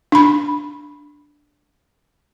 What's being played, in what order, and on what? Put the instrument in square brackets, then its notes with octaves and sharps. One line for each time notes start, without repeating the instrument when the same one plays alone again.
[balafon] D4 B5